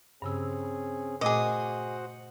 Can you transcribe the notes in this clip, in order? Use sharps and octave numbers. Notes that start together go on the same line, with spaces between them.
G2 C#3 C4 C#4 G#4 E6
A#2 A3 F#4 G#4 C5 D#5 F#5 D6